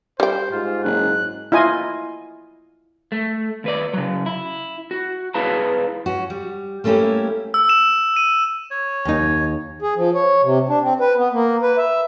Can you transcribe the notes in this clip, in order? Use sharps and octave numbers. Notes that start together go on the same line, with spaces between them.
G3 C5 G5
G#2 F4
F#1 F#6
E4 F4 D#5 G#5
A3
D#2 B4 D5
C#3 F#3
E4
F#4
E4 G#4 B4 F5 A5 A#5
C#4 F#4
G3
G3 A3 A#3 C#4 E4 G4
E6
E7
D#7
C#5
D#2 D#4
G#4
F3
C#5
C3
D4
C4
B4
B3
A#3
B4
E5